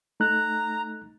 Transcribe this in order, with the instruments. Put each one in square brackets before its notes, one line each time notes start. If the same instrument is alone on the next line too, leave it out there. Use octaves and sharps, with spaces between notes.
[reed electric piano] A3 D#4 F#6 [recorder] A#5